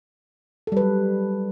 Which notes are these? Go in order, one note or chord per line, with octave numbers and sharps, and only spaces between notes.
F#3 G3 A4 B4